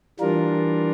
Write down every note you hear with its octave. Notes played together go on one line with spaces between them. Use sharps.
E3 G3 D4 F4 A#4